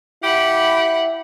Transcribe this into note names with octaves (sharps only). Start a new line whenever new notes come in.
E4 G4 F#5 B5